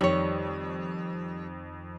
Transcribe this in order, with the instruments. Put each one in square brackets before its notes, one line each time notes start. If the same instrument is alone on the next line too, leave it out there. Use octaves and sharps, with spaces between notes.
[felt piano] F2 D#3 [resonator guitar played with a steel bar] G3 C#5